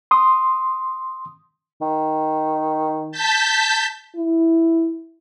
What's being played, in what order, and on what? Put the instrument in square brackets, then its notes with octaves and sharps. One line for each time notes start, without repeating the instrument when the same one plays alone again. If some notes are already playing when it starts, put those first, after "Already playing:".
[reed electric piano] C6 D#6
[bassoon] D#3
[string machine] A5 G6 B6
[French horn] E4